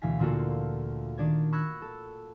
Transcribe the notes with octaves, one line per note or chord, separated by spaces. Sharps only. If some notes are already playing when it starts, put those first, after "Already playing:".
D2 B2 E3 F5 G#5 B6
A#2 D3 A#3 F4 F#4 A4
D#3 D4 D5 G#6
B5 C#6 E6 F#6 G#6 A#6
A4